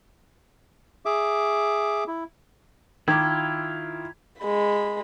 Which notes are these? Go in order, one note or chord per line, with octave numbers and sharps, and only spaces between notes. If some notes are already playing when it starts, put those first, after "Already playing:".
G#4 E5 D6
E4
D#3 E4 F4 D6 G#6
G#3 B5